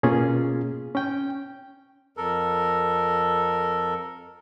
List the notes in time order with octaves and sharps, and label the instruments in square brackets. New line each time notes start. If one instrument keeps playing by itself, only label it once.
[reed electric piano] B2 A#3 C#4 F4 G#4
C#4 G5
[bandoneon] F2 A4 A#4